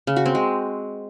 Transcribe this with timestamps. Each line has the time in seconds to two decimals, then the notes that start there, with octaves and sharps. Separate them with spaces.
0.07 C#3
0.16 F#4
0.26 C4
0.35 G#3